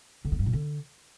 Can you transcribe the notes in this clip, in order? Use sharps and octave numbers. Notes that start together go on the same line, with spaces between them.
D3
B3
G2
A#2
D3